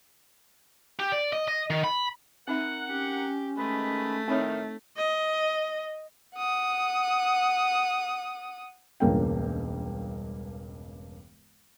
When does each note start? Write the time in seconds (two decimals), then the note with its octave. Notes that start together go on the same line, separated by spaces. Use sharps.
1.00 G4
1.12 D5
1.33 D#5
1.48 D#5
1.70 D#3
1.84 B5
2.48 C4 D#4 A#4 E5 F#5
2.87 C#4 G4
3.57 D#3 G#3 A3 B4
4.28 A2 D#3 C4 D#4 C#5 E5
4.97 D#5
6.36 F#5 D#6
9.00 E1 C#2 G2 A#3 C#4 G5